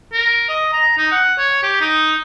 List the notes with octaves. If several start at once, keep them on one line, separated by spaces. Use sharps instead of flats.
A#4
D#5
A#5
D#4
F#5
C#5
G4
D#4